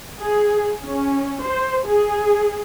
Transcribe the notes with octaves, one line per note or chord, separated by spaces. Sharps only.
G#4
C#4
C5
G#4